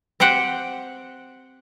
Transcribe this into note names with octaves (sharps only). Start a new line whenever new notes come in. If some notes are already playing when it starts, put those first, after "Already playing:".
C4 G4 C5 F#5 G5